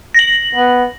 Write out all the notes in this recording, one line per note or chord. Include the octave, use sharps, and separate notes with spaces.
A#6 F#7
B3